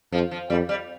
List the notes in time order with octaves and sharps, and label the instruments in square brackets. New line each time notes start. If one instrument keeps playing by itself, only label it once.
[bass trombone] F2 [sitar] F3
[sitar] F3
[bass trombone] F2 [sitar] G3
[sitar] G3